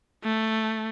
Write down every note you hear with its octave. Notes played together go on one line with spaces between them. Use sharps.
A3